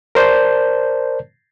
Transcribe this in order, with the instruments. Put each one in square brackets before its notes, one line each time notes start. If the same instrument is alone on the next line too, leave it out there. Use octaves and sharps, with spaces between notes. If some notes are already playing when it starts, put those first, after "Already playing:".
[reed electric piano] A#4 C5 D5 A5 G6